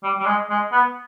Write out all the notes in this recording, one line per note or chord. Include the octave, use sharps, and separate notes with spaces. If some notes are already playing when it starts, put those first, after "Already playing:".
G3
G3
G#3
G#3
B3